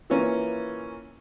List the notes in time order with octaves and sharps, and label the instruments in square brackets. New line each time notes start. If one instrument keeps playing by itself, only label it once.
[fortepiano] E3 A#3 C#4 F4